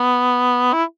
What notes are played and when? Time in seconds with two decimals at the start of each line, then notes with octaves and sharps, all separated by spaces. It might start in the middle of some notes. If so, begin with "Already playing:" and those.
Already playing: B3
0.73 E4